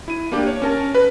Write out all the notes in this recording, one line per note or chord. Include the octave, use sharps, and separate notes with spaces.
E4 D#7
A#3 D4 G4
C#5
C#4 A#4 A5
B4